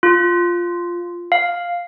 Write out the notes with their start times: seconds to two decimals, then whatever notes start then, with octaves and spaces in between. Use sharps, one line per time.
0.03 F4
1.32 F5